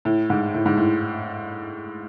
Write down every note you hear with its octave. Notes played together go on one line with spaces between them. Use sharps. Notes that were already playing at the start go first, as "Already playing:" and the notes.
A2
G#2
A2
G#2
A2